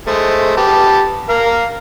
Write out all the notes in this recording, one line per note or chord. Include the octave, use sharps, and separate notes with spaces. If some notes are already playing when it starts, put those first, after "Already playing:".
G#3 A3 C5
B3 G4 A5
A#4 F5